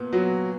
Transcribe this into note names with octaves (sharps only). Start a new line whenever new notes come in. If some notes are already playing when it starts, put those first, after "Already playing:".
Already playing: A#2 B3
F#3 B3 F#4